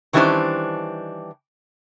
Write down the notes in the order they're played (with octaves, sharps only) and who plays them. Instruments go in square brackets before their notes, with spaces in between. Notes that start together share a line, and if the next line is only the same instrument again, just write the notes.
[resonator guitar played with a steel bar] D#3 E3 G3 C#4 D4 C5